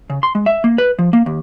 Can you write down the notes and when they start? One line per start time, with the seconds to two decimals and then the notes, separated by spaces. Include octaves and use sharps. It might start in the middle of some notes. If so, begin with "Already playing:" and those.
0.10 C#3
0.23 C6
0.35 G#3
0.46 E5
0.64 A#3
0.78 B4
0.99 F3
1.13 A#3
1.26 D#2